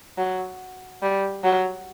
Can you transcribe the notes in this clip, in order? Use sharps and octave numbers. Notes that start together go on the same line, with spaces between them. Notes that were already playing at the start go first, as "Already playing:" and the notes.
F#3
G3
F#3